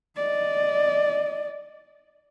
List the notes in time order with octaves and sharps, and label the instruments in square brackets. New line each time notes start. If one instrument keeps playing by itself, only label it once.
[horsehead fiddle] D5 D#5